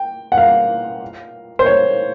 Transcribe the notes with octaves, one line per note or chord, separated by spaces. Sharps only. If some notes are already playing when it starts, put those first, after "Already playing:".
Already playing: G5
F#5
F5
C5
C#5